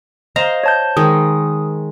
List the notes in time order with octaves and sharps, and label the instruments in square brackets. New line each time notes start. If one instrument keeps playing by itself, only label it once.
[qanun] C5 F5 A#5 [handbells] D#5
[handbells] C#5 A5 G6
[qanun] D#3 G#3 [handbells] D#6